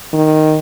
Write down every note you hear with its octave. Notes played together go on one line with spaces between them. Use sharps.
D#3